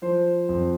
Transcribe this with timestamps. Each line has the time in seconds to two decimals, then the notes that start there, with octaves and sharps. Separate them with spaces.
0.02 F3 C5
0.49 F2